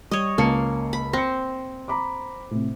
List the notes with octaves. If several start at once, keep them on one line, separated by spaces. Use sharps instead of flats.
G3 C#5 D#5
C#2 A#3 A5 C#7
B5
C4 A#6 C#7
A#5 B5 D6
A2 C3